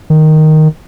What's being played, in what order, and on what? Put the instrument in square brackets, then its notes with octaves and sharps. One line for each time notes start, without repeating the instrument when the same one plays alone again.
[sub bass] D#3